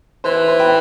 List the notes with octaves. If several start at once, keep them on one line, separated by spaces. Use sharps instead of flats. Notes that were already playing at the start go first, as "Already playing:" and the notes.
E3 C5
B4
C5
G5 B5